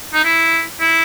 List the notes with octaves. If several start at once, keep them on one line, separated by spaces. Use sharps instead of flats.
D#4
E4
E4